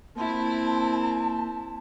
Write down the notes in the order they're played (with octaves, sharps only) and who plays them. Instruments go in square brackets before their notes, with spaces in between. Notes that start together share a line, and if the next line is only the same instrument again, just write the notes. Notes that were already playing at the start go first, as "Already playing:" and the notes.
[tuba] A#3 [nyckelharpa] C4 E4 [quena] A5